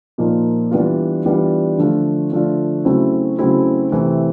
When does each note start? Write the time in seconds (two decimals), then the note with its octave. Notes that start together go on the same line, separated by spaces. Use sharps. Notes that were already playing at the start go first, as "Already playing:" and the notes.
0.18 A#2 F3 A#3 D#4
0.71 E3 G3 B3 D4 F4
1.25 E3 G3 B3 D4 F4
1.78 D3 F3 A3 D4 F4
2.32 D3 F3 A3 D4 F4
2.85 C#3 F#3 A3 C4 E4
3.39 C#3 F#3 A3 C4 E4
3.92 C3 E3 A3 C4